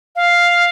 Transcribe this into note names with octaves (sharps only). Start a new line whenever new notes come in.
F5